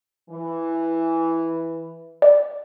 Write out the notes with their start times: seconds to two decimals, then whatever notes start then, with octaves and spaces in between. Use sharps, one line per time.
0.30 E3
2.22 D5